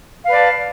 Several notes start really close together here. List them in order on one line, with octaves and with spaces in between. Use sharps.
F5 B4 D5 A5